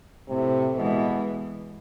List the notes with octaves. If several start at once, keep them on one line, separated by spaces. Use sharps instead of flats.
A2 C3
B2 E3 G#3